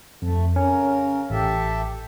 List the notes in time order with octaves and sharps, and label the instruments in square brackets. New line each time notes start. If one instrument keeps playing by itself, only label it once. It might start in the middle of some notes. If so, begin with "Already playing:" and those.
[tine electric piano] F2 [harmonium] A3
[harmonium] C#3 A#4 [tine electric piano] C#4
[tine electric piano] A1 [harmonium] G4 A4 E5